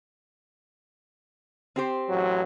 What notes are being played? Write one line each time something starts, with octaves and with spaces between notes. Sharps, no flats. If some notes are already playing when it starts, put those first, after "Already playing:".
C4 G4 C5
A1 F#3